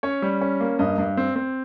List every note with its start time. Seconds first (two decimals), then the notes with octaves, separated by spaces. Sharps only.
0.03 C#4 C#5
0.22 G3
0.41 C#4
0.60 A#3
0.79 G2 D#5
0.98 G2
1.17 C4
1.36 C4